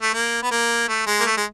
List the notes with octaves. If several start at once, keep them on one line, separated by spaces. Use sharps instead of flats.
A3
A#3
B3
A#3
A3
G#3
A#3
A3
G#3